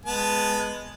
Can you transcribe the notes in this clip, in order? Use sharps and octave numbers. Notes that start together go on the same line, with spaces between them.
G#3 B3 A5